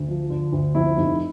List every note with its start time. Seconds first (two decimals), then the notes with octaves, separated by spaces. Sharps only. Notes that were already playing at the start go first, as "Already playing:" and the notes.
Already playing: D2
0.08 F3
0.30 D3
0.52 D2
0.75 F2 E4
0.97 F1